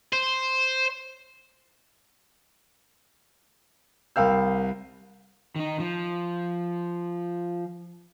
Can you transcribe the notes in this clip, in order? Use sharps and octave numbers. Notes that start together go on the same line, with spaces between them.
C5
C2 A#4 F5 G5 E6 G6
D#3 D#4
F3